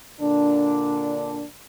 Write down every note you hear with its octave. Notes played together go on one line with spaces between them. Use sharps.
A#2 D3 D4